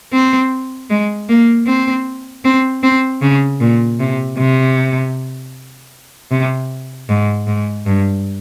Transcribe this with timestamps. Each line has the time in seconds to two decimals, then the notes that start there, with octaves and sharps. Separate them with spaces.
0.13 C4
0.90 G#3
1.29 A#3
1.67 C4
2.44 C4
2.83 C4
3.22 C#3
3.60 A#2
3.99 C3
4.38 C3
6.31 C3
7.09 G#2
7.47 G#2
7.86 G2